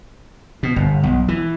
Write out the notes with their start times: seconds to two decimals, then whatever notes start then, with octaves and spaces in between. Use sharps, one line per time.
0.63 B2
0.76 G1
1.03 B1
1.28 E3